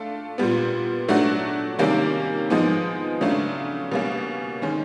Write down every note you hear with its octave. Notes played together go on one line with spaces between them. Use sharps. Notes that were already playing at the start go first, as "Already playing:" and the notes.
Already playing: A3 D4 F4 A4
A#2 G3 B3
F#3 A3 D4 F#4
C3 D#3 G3 A#3 C#4
F3 G#3 B3 D#4
C#3 F#3 A3 D4 F4
B2 G3 A#3 C#4
D#3 G#3 C#4